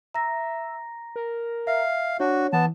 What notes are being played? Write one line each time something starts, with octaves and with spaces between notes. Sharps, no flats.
E5 A#5 A#6
A#4
E5 F5
D4 F#4 C#5
E3 B3 A5